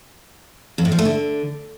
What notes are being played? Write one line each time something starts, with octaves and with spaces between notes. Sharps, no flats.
F2
A2
F3
A3
D3